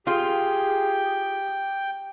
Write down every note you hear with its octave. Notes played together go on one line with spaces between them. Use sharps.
F4 G4 G#4 G5